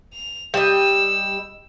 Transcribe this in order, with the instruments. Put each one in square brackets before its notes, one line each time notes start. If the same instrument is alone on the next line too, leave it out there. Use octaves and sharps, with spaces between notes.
[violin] F7
[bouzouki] G3 D#5 [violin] E6